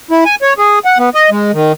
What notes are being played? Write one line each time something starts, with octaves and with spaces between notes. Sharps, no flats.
E4
G#5
C#5
G#4
F#5
B3
D#5
G#3
D#3